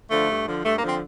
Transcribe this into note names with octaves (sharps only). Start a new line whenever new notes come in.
D3 F3 A3
G2
D3 F3
G2 A3
A#3
D3 F3
C4